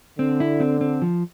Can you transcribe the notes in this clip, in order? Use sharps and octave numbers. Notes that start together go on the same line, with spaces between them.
D3 C4
E4
C4
C4
F3